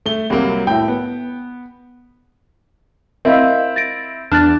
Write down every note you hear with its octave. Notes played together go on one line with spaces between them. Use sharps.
A3 G7
C2 F#3 A#3
A2 E4 G5
B3
C4 E4 A#4 D#5 F5
A6 A#6 D7
E2 D4 A5 F6 F#6 A6